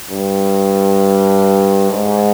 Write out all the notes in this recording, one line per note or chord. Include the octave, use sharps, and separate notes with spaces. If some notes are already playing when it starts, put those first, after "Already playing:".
G2
G#2